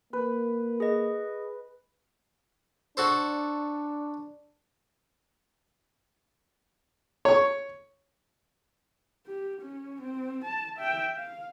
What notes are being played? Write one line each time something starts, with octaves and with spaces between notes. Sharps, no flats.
A#3 B4
G#4 D#5
D4 F#4 A4 C5
C#5 C#6
G4
C#4
C4
A5
E5 G5
F5